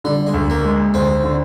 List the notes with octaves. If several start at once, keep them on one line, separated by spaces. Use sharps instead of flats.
D3 G3
G#3
D2
A#3
G#3
D2 C4
D3